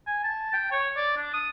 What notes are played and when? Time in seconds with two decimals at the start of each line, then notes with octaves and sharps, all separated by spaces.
0.07 G#5
0.24 A5
0.53 G5
0.72 C#5
0.97 D5
1.17 D4
1.34 D#6